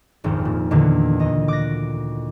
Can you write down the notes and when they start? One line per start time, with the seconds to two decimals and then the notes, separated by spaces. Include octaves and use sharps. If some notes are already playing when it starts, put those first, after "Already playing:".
0.24 D#1 G#1 F2
0.45 A#2
0.71 E2 A#2 D3 D#3
1.20 D2 D#5
1.48 D6 F#6 A#6